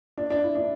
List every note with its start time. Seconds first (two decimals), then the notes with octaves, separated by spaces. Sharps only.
0.18 D4
0.30 D4
0.43 E4
0.55 D4